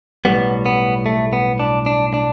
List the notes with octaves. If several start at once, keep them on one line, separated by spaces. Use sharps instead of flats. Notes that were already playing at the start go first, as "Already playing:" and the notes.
B1 A2 G3 B3
B3
A3
B3
D4
D4
D4